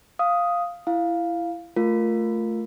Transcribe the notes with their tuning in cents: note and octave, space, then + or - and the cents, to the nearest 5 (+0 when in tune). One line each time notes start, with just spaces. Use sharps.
F5 +0 D#6 +5
E4 +20 F5 +0
A3 +0 F4 +5 A#4 +0